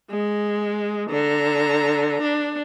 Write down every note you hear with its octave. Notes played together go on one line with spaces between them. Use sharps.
G#3
D3 A#5
D4